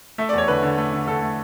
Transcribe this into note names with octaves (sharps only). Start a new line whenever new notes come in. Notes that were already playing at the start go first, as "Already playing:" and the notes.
A3 E5
D5
E2 C#5
D3 B4
D3
A3
D3
D3 A4
A3